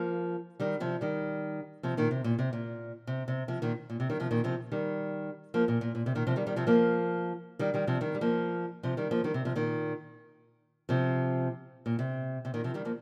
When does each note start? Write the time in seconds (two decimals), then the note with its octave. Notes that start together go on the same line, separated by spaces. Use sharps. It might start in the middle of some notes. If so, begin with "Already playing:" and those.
Already playing: F3 A#3
0.60 D#3 G3
0.80 C3 F3
1.01 D#3 G3
1.83 C3 F3
1.97 A#2 D#3
2.11 C3
2.24 A#2
2.39 C3
2.53 A#2
3.07 C3
3.28 C3
3.48 C3 F3
3.62 A#2 D#3
3.90 A#2
4.00 C3
4.10 D#3 G3
4.20 C3 F3
4.31 A#2 D#3
4.44 C3 F3
4.72 D#3 G3
5.54 F3 A#3
5.68 A#2
5.81 A#2
5.95 A#2
6.06 C3
6.15 A#2 D#3
6.27 C3 F3
6.36 D#3 G3
6.47 D#3 G3
6.56 C3 F3
6.67 F3 A#3
7.59 D#3 G3
7.74 D#3 G3
7.87 C3 F3
8.01 D#3 G3
8.15 G3
8.21 F3 A#3
8.83 C3 F3
8.97 D#3 G3
9.11 F3 A#3
9.24 D#3 G3
9.34 C3
9.45 C3 F3
9.56 A#2 D#3
10.89 C3 F3
11.86 A#2
11.99 C3
12.45 C3
12.54 A#2 D#3
12.64 C3 F3
12.74 D#3 G3
12.85 F3 A#3